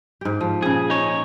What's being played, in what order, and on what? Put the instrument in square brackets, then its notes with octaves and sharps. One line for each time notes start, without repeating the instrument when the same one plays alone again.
[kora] G#2 G4
F3
[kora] A#2 C#3 [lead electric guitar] G#4
[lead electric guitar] D#4 C#5